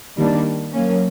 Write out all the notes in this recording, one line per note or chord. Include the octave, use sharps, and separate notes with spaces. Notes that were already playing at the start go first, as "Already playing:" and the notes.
D#3 G3 A#3 D4
F#3 A#3 C#4